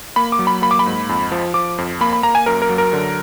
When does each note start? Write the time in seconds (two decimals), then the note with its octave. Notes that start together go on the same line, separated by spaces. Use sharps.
0.16 A#3 B5
0.32 D6
0.39 F#3
0.47 B5
0.62 A#3 B5
0.71 D6
0.79 B5
0.86 G#2
1.09 F2
1.32 F3
1.54 F3 D6
1.78 F2
2.01 A#3 B5
2.13 B5
2.23 A#3 A#5
2.35 G#5
2.46 F#2 A#4
2.62 A#4
2.69 F#3
2.78 A#4
2.93 D3